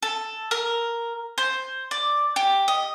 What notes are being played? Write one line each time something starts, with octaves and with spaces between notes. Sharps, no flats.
A4
A#4
C5
D5
G4
D#5